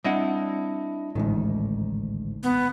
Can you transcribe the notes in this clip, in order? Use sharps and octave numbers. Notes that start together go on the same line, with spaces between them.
G3 C4 D4 E4 D#5 F#5
A1 D2 G#2 D#3
B3